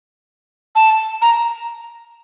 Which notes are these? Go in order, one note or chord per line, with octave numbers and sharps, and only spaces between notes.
A5
A#5